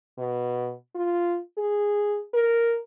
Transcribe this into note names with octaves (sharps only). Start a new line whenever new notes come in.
B2
F4
G#4
A#4